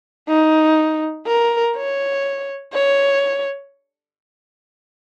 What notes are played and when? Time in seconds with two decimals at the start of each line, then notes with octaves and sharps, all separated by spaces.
0.29 D#4
1.27 A#4
1.76 C#5
2.74 C#5